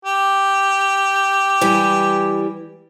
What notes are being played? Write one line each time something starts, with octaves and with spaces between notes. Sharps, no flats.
G4
E3 G3